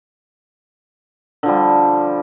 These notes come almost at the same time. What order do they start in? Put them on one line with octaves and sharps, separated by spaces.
D3 F3 G3